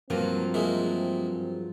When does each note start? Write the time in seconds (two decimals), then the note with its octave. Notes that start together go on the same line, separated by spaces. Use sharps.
0.10 G2 F3 F#3 A#3 C4
0.54 G#3 A#3 E4